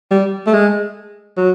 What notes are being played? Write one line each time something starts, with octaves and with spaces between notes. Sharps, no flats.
G3
A3
G#3
F#3